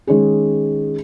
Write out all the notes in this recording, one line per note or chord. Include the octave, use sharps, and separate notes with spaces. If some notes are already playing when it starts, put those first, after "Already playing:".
D#3 G#3 C#4 G#4